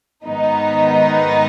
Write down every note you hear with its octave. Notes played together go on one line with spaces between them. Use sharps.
G#2 D#3 B3 D#4